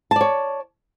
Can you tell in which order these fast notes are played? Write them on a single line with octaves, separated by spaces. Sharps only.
A5 D5 C#5